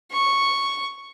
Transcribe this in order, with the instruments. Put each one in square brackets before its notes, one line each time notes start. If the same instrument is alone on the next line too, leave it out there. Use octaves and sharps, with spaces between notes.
[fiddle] C#6